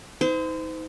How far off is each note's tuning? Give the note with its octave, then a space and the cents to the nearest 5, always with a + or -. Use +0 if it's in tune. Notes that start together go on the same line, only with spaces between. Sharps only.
D#4 +40 C5 -35